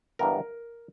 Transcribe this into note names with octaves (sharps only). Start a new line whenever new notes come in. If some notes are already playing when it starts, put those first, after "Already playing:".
G1 G2 E3 G#3 B3 A#4